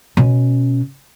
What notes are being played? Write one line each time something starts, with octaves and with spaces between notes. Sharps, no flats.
B2 C#4